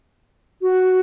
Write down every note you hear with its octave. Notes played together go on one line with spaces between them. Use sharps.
F#4